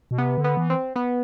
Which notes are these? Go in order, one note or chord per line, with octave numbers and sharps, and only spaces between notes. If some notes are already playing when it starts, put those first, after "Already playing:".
B2
C3 B3
D3
B3
E3
C4
B3